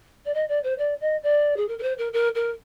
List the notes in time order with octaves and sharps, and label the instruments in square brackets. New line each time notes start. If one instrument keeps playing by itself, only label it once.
[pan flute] D5
D#5
D5
C5
D5
D#5
D5
G#4
A#4
A#4
C5
A#4
A#4
A#4